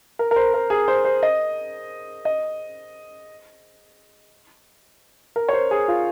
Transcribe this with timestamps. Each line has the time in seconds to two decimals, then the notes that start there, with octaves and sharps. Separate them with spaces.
0.19 A#4
0.31 A#4
0.36 C5
0.54 A#4
0.70 G#4
0.88 C5
1.05 C5
1.23 D#5
2.25 D#5
5.36 A#4
5.49 C#5
5.53 C5
5.71 G#4
5.88 F4